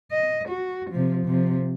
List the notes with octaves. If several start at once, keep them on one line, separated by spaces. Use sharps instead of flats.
D#5
F#4
C3 F3
C3 F3